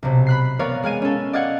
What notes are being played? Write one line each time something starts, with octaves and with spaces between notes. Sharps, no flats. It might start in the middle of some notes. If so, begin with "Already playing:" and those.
B1 C3
B5 F#6 C7
B3 A#4 C#5 D5 F5
G#3 F5 G#5 D#7
C#4 A4
D5 D#5 F5 F#5 G#6 C#7